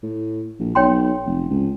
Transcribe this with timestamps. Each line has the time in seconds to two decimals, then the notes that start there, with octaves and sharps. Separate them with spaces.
0.03 A2
0.59 A#1
0.75 B1 C#5 G5 C6
1.26 F1
1.50 C#2